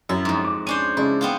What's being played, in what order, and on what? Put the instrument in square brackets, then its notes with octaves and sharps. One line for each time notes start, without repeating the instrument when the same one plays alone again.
[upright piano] F#2 [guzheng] E4
[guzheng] F2 G#2
[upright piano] D6
[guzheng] C#4 D4 C5 [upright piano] D#7
[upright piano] C#3 G#3 D4 [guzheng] E4
[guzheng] B3 C4 F4